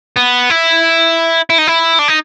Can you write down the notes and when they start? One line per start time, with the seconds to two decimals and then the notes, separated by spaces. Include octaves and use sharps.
0.16 B3
0.50 E4
1.50 E4
1.58 D#4
1.67 E4
1.99 D4
2.08 D#4